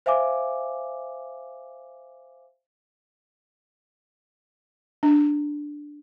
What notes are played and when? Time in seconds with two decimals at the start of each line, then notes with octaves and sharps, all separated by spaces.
0.06 C5 E5 F5 G#5 D6
5.03 D4